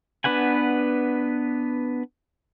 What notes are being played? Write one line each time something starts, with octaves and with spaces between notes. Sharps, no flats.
B3 D4 B4 F#5 G#5